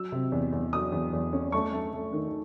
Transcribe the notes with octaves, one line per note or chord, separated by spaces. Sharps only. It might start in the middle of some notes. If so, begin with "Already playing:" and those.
Already playing: F#3 E6
C3
E2
E2
F#3 D#6
E2
E2
C#4
A3 C#6
A3
A3
D#3